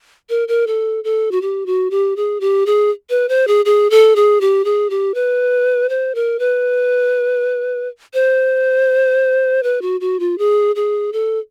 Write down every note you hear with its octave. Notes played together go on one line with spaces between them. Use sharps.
A#4
A#4
A4
A4
F#4
G4
F#4
G4
G#4
G4
G#4
B4
C5
G#4
G#4
A4
G#4
G4
G#4
G4
B4
C5
A#4
B4
C5
B4
F#4
F#4
F4
G#4
G#4
A4